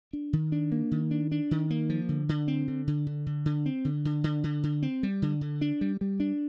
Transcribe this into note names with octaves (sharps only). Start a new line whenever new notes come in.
D4
D#3
D4
A#3
D#3
D4
D4
D#3
A#3
F3
D3
D3
C4
D3
D3
D3
D3
D3
C4
D3
D3
D3
D3
D3
C4
G3
D3
D3
D4
G3
G3
D4